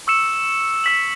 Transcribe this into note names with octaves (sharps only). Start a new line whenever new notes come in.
C#6 E6 C#7 E7
E6 B6 F#7